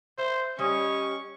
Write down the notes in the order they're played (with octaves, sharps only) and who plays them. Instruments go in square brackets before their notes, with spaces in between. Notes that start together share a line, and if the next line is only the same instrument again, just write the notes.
[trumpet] C5 [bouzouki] E5
[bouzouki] G3 D#5 [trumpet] C#4 [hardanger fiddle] C#6